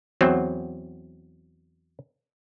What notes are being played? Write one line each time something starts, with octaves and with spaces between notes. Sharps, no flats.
E2 F#3 C4